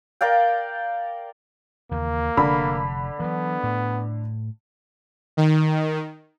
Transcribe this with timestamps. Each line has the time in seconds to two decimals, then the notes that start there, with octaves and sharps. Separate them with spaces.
0.21 A#4 D5 F5 G5
1.91 D#2 C#3 E3 A#3
2.37 F1 D3 B5
3.20 E3 F#3 B3
3.63 A2
5.37 D#3